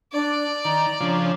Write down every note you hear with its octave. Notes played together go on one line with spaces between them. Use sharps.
D4 D5
D#3 A#5
C#3 F3 D4